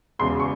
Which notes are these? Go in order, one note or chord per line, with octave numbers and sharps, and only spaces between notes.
E1 E2 C#3 C6
C#6